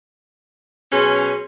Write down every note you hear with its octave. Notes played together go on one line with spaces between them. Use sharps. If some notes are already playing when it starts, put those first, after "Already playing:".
B2 F#3 C#4 G#4 C6